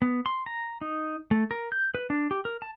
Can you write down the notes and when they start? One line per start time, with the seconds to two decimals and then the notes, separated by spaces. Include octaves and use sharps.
0.02 B3
0.26 C6
0.46 A#5
0.81 D#4
1.31 A3
1.51 A#4
1.72 G6
1.95 B4
2.10 D4
2.31 G4
2.45 A#4
2.62 A5